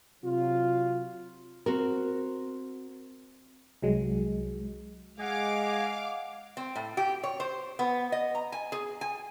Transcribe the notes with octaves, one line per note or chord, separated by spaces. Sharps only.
C3 F#3 F4
C4 F#4 A#4
C2 F#3 G#3
G#3 D#5 F5 F#5 G#5 D6
C4
A2
G4
C#5
C5
B3
D#5
A#5
G#5
G#4
G#5